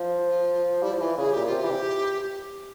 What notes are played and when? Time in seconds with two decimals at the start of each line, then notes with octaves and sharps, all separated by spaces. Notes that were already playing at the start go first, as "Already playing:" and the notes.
Already playing: F3
0.29 F4
0.82 G3 E4
0.93 F3
1.00 E3 F4
1.18 C#3 G#4
1.31 A#2 G4
1.46 C3 F4
1.60 E3 G4
1.71 C3